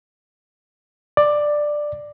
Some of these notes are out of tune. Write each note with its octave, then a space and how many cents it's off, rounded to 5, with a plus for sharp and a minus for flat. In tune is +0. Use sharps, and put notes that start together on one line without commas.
D5 +10